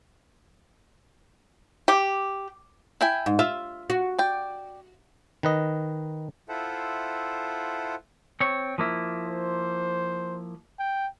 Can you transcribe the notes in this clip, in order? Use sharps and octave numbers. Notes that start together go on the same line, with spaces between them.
G4
E4 G5 G#5
G#2
F4 E5
F#4
D5 G5
D#3 B4 D#5
E4 F4 A4 C5 E5 F#5
C4 C#5
F3 A#3 E4
C5
G5